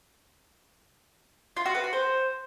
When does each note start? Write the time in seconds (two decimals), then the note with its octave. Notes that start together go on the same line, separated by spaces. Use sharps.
1.57 F4
1.66 F#4
1.75 B4
1.84 F#4
1.93 C5